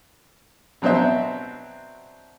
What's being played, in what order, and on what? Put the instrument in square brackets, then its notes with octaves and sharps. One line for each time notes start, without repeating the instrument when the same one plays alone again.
[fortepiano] B2 F#3 C4 D4 C5 E5